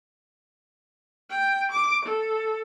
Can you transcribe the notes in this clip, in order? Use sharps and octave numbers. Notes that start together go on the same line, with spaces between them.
G5
D6
A4